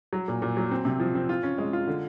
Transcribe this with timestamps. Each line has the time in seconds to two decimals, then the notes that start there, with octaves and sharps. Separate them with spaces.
0.13 F#3
0.28 A#2
0.42 A#2
0.57 F#3
0.71 C4
0.85 C3
1.00 F3
1.15 C4
1.29 F4
1.43 C#4
1.58 G#3
1.73 F4
1.87 D3